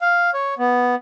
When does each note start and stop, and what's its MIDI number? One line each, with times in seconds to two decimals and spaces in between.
0.01 0.30 77
0.34 0.54 73
0.58 0.95 59